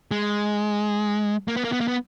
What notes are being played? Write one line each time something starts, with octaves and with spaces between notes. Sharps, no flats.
G#3
A#3
B3
A#3
B3
A#3
B3